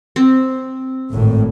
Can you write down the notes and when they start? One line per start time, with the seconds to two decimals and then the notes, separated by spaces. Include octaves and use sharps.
0.16 C4
1.12 G#1 A2